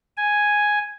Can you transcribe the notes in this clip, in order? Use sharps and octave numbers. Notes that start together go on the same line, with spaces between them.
G#5